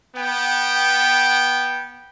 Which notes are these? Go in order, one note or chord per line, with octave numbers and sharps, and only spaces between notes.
B3 G5